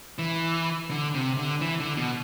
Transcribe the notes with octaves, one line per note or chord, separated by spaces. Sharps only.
E3
D3
C3
D3
E3
D3
B2